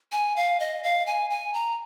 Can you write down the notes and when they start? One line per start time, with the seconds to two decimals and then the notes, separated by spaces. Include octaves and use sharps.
0.12 G#5
0.36 F5
0.60 D#5
0.83 F5
1.06 G#5
1.30 G#5
1.54 A#5